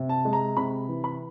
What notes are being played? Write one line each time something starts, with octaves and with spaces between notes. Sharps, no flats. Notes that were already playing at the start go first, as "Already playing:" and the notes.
Already playing: C3
A5
G#3
A#5
C3 B5
E3
B5